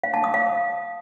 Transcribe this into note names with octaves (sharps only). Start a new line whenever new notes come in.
F5
A5
D#6
F5